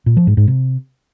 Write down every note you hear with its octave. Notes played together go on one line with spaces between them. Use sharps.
A#2
F3
G#2
G#2
C3